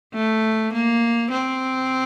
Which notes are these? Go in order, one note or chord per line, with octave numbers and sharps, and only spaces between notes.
A3
A#3
C4